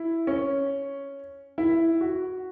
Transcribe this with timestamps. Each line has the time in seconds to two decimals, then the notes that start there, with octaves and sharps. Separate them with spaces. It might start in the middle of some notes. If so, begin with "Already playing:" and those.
Already playing: E4
0.27 C#4
1.58 E4
2.01 F#4